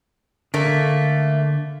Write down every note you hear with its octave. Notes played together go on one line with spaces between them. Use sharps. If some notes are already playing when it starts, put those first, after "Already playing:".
D3 A3 A#3